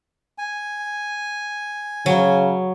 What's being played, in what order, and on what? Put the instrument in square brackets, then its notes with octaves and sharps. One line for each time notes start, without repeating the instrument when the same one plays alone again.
[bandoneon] G#5
[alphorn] C#3 [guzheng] F#3